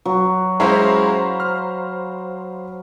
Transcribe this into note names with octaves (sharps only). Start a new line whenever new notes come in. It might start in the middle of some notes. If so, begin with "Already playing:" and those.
F#3
G#3 C#4 E4 C5 F5 A#5 B5
F6